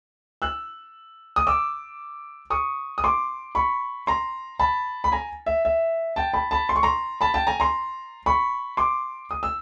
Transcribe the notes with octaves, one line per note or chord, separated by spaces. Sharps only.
E6 F#6
D#6
D6 E6
C#6 D#6
D#6
C6 D6
B5 C#6
A#5 C6
A5 B5
B5
G#5 A#5
E5
E5
G5 A5
A5 B5
A5 B5
C6
C#6
A#5 C6
A5 B5
G5 A5
G#5 A#5
A#5 C6
B5 C#6
C6 D6
D#6
E6